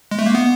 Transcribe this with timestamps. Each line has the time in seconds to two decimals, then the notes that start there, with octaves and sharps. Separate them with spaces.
0.11 G#3
0.19 A3
0.26 A#3
0.35 B3